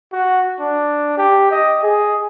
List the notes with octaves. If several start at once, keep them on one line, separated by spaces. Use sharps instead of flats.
F#4
D4
G4
D#5
G#4